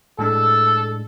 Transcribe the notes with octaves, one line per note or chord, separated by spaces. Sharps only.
A2 G#3 D4 A4